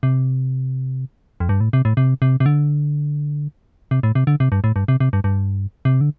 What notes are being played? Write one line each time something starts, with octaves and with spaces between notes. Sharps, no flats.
C3
F2
G2
A2
C3
A2
C3
C3
C3
D3
C3
A2
C3
D3
C3
G2
A2
G2
C3
C3
G2
G2
C3
D3